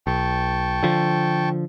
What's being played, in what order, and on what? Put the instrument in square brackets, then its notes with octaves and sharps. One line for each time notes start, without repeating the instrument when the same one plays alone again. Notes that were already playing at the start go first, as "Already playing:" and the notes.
[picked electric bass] B1 [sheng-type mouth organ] G5 A5 C#6
[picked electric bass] D3 F3